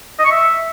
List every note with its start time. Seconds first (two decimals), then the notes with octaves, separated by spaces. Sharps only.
0.19 D#5
0.25 C#6
0.31 E5